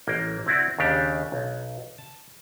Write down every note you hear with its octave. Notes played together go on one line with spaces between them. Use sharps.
A1 A#3 G5
C4 E4 F#4 D5
D#2 C#3 D4 G4
B1
A5